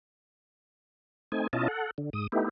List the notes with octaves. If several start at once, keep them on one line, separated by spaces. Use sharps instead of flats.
A3 C4 D#4 G#5
B2 C#4 E4 F4 D#5 A5
A4 F#5
D3
G#2 D#6
A3 B3 D#4 E4 G4